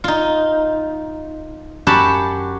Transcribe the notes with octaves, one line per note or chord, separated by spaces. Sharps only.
D#4 F4
F#2 F#4 G4 F#5 A5 B5